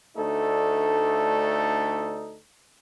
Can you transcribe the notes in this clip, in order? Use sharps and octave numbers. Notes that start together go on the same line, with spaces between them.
D2 A3 D4 D#4 A4